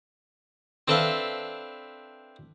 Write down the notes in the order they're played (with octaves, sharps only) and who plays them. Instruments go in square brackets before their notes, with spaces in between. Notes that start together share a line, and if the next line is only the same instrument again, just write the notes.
[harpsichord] C4 D4 A4 B4 E5 F5